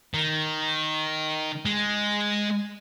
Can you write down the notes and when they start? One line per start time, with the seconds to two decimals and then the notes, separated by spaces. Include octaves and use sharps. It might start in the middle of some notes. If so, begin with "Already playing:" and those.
0.14 D#3
1.66 G#3